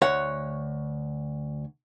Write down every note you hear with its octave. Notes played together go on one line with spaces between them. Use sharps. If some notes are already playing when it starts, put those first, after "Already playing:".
D2 C#5 F#5